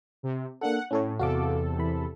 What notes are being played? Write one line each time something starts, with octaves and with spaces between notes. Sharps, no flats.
C3
A#3 D4 A4 F#5
A2 C#4 A4 C#5
E2 C3 F#4 A4 F5 D6
E3 B5